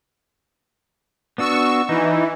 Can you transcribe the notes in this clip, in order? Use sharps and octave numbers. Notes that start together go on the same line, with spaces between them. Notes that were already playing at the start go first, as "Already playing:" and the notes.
B3 D4 F#4 C#6 E6
E3 D#4